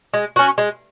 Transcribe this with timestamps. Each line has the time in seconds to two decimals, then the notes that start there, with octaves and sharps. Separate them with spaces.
0.14 G#3
0.36 C#4 F#4
0.58 G#3